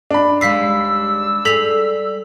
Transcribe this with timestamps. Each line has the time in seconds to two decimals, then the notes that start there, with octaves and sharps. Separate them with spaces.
0.11 D4 B5
0.41 D#2 G3 G#3 F5 E6 B6 C7
1.45 G3 G#4 A4 B6 F7